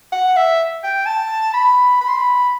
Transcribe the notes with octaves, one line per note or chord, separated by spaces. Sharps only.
F#5
E5
G5
A5
B5
B5
C6
B5